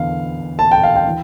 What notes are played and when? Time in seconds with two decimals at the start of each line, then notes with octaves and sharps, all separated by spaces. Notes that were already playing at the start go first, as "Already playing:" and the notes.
Already playing: E2 D3 F5
0.59 A5
0.72 G5
0.84 F5
0.95 G5
1.07 E3